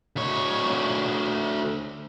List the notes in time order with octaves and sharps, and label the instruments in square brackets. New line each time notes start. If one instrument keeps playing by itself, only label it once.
[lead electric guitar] D2 C#5